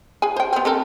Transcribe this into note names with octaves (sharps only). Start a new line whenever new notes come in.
G#4 G#5
C5 G5
B3 C4
C4 A4 A#4